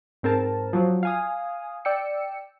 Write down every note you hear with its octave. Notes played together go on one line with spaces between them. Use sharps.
G#2 C4 A#4 A5
F3 F#3
F5 G#5 D#6
D5 G5 E6 C#7